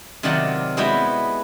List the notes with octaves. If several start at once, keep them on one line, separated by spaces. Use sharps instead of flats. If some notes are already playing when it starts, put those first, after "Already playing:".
C3 D#3 F#3 F4 D5 F#5
G#3 B3 E4 F#4 E5 G5